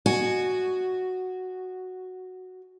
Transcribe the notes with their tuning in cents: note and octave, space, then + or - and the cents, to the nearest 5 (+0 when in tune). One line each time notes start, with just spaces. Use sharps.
F#4 +0 D#5 -30 G#5 +0